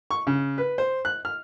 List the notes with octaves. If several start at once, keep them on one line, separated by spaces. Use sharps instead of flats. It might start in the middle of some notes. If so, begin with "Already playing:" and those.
C#6
C#3
B4
C5
F#6
F6